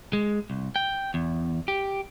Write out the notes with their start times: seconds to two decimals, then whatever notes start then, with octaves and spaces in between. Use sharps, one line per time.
0.13 G#3
0.50 C2
0.76 G5
1.14 E2
1.68 G4